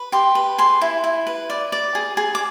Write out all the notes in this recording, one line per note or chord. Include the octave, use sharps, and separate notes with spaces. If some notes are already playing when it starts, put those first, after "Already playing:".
Already playing: B4
G4 C6
B4
G#4 C6
E4
E4
B4
D5
D5
G#4
G#4
D6